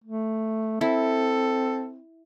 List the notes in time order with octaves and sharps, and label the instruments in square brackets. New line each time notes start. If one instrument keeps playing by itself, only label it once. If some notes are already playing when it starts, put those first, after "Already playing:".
[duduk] A3
[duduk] C4 [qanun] E4 [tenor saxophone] A4